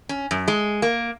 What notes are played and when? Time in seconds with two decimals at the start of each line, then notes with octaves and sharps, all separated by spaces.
0.09 C#4
0.31 F#2
0.48 G#3
0.82 A#3